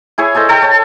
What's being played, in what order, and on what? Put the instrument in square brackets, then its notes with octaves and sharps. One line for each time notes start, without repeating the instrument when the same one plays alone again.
[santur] E4 G#4 C#5 G#5
G#4 A4 C5 D#5
A4 G5
C#5 A5